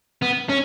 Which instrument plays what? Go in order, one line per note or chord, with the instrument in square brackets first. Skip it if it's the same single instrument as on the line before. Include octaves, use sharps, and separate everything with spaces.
[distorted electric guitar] B3
C#4